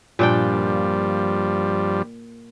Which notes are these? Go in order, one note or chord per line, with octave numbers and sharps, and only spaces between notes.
G2 A#2 F3 G3 D4 G5